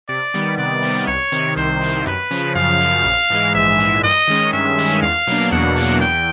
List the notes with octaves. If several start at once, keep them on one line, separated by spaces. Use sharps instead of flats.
C3 D5
D#3 G3 B3
C3 D5
D#3 G3 B3
C2 C#5
C3 D#3
C2 C5
C3 D#3
F#2 B4
C#3 F3
F#2 F5
C#3 F3
A#1
G#2 E3 G#3
A#1 E5
G#2 E3 G#3
G2 D#5
D#3 G#3 C#4
G2 E5
D#3 G#3 C#4
E2 F5
B2 F#3 A#3 D4
E2 F#5
B2 F#3 A#3 D4
E2 G5